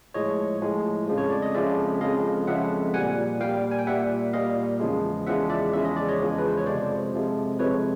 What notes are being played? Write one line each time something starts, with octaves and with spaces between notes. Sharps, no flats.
A2 F3 G#3 C#5 D#5
A2 F3 G#3
F2 C#3 F3 G#3
C#5
D5
D#5
F2 C#3 F3 G#3 D5 E5
F2 C#3 F3 G#3 D#5 F5
F2 C#3 F3 G#3 E5 F#5
A#2 G3 F#5 G#5
A#2 G3 F5 G5
G#5
G5
A#2 G3 E5 F#5
A#2 G3 D#5 F5
E2 C#3 F3 G#3
E2 C#3 F3 G#3 E5 F#5
D5 E5
E2 C#3 F3 G#3 E5
D#5
D5
C#5 D#5
E2 C#3 F3 G#3
B4
C5
C#5
F2 C3 F3 G#3 C5 D5
F2 C3 F3 G#3
F2 C3 F3 G#3 B4 C#5